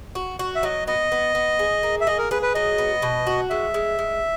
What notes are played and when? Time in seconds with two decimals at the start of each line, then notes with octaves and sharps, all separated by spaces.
0.15 F#4
0.39 F#4
0.55 E5
0.63 F#3 D#5
0.87 B3 D#5
1.12 B3
1.35 B3
1.59 G#4
1.83 A#3
2.01 E5
2.07 G#4 D#5
2.18 A#4
2.31 G#4 B4
2.42 B4
2.55 F#3 D#5
2.78 B3
3.02 B2
3.27 F#4
3.50 G#3 E5
3.74 G#3
3.99 G#3